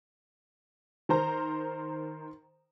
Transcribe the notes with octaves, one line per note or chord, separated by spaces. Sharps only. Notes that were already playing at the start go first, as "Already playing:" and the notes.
D#3 A#4 C5 A#5